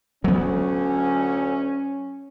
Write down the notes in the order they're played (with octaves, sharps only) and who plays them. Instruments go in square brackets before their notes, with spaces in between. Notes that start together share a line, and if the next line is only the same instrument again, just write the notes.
[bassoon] D2 [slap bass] F#3 B3 [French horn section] C#4